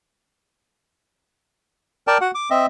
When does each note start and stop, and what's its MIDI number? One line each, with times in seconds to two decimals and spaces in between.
2.07 2.18 70
2.07 2.18 74
2.07 2.18 79
2.07 2.18 81
2.21 2.31 66
2.21 2.31 78
2.35 2.49 86
2.50 2.66 60
2.50 2.66 75
2.50 2.66 76